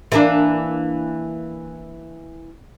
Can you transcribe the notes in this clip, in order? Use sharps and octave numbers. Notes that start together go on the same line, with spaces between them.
E3 A#3 D4